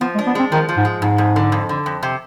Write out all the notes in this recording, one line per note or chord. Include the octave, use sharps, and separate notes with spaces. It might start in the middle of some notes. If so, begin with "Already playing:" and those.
F3 B3
G#3
D4
B3
G#3 C4
D#3 F3
F3
G#2
G#3
F2 G#2
F2
D3
F2
D3
F2
C3